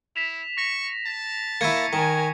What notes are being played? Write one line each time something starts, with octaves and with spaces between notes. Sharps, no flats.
E4 B6 E7 F7
C#6 A#6
A5
A#3 E4 C#6 G#6 C#7
D#3 A#4 G#5